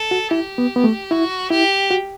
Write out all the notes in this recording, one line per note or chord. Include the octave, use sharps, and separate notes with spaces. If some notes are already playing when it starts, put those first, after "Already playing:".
Already playing: A4
F#4
E4 G4
B3
B3
A3
E4 F#4
E4 G4
F#4